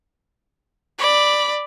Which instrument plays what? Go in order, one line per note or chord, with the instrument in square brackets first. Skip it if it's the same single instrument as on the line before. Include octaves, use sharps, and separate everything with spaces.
[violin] D5 B5